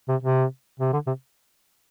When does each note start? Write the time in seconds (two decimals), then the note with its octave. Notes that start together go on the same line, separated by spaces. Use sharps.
0.08 C3
0.23 C3
0.80 C3
0.93 D3
1.07 C3